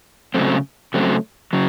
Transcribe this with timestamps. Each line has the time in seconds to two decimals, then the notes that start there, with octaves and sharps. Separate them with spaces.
0.34 C#3 F#3 A3 C4
0.94 C#3 F#3 A3 C4
1.53 C#3 F#3